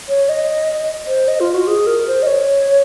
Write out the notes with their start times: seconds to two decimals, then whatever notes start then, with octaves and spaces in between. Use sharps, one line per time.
0.09 C#5
0.29 D#5
1.07 C5
1.28 D#5
1.40 F4
1.54 F#4
1.67 G#4
1.87 A#4
2.07 C5
2.23 D#5
2.27 C#5